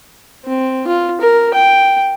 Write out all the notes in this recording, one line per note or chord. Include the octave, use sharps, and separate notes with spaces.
C4
F4
A#4
G5